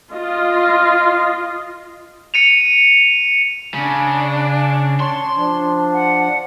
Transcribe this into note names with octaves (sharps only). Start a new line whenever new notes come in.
F4 D#5
C#7 D#7 F7
C#3 D4
C#5 A5 C6 C#6
F3 D4
F#5